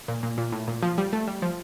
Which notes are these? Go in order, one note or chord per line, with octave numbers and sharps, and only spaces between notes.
A#2
A#2
A#2
A2
A#2
F3
G3
A3
G3
F3